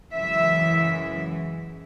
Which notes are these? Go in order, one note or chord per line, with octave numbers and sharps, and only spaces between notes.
F#2 C#3 E3 G#3 E5